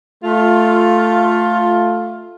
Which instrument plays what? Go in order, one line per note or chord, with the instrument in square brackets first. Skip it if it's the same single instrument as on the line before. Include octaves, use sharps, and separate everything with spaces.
[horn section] A3 F4